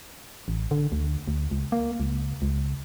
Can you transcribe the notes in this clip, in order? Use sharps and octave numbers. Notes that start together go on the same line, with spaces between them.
A1
D3
D2
D2
C#2
A#3
C#2
C#2